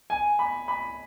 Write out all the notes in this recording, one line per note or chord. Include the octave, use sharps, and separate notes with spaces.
G#5
B5
B5